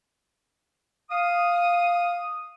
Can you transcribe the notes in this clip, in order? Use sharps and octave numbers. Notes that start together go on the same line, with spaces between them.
F5 D#6